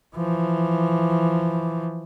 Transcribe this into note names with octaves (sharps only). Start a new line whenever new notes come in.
E3 F3